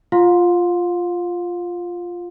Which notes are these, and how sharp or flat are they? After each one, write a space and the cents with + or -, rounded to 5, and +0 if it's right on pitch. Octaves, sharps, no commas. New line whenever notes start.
F4 +0 F5 +35 C6 +0